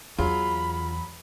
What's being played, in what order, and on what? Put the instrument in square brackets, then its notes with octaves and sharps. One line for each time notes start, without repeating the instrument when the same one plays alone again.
[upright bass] E2 [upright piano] F#3 G#4 [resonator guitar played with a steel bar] F4 [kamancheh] B5